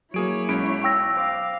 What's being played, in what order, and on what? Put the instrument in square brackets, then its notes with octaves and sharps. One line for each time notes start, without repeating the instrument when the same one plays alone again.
[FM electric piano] F#3 [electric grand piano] A#3 G#4 D7 [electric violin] E4 C#5
[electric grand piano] B1 B5 D7 [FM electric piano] G#3 C#4
[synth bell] G5 E6 A#6
[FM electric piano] C5 D6 [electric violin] F5